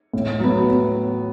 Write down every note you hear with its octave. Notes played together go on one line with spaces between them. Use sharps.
A2
F#3 B3